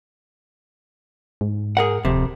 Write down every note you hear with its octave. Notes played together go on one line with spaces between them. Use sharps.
G#2
G#4 A#4 F#5
D1 F2 C3